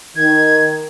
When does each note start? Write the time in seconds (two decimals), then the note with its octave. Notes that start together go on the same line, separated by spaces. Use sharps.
0.16 D#3 G#6